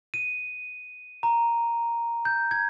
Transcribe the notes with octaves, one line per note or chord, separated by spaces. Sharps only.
D#7
A#5
G6
G#6